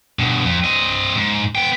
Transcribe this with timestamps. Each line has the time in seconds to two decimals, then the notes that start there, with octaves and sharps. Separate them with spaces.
0.19 G2 B2
0.45 F2
0.64 C4 D#5
1.16 G#2
1.55 B3 G5